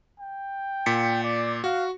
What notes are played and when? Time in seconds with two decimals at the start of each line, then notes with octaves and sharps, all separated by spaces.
0.20 G5
0.86 A#2 B6 C#7
1.24 D5
1.64 F#4 F5